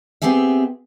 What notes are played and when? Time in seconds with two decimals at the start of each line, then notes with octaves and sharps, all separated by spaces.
0.22 B3 C4 G4 G#4 E5